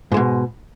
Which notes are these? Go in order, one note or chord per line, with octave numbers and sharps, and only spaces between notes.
G#2 B2 G#3